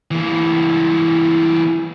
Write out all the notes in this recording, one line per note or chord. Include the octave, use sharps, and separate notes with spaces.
E3 A#3